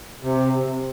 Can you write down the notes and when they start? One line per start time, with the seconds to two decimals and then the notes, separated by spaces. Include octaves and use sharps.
0.23 C3